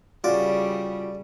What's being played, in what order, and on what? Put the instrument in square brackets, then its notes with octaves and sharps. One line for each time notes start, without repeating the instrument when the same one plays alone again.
[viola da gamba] C#3 G3 [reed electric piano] F4 F#4 [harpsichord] D5